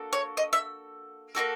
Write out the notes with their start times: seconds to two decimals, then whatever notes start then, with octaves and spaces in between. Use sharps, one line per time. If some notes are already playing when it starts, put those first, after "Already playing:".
Already playing: A#3 D4 F#4 A4
0.13 C#5
0.37 D#5
0.53 E5
1.35 A#3 D#4 F#4 A4